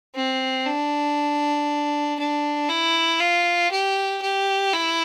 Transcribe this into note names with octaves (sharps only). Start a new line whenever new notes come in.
C4
D4
D4
E4
F4
G4
G4
E4